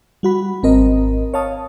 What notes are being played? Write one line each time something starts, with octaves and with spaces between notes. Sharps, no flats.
G3 F#4 B5
G#1 C4 A#4 D#5
C#5 F5 A5 D#6